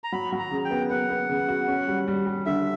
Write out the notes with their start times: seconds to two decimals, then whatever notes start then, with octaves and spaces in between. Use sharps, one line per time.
0.04 A#5
0.12 F#3 B5
0.32 F#3
0.39 A#5
0.51 C#3
0.65 G5
0.71 B3
0.90 B3 F#5
1.10 B3
1.29 C#3
1.49 F#4
1.68 C#4
1.88 G3
2.08 G3
2.27 G3
2.46 D3 E5